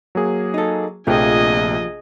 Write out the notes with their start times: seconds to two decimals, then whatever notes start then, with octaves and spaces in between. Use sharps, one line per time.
0.15 F#3 A#3 G#4
0.54 D#4 A4
1.07 A#1 C3 F3 A3 A#3 G4 G#4 D#5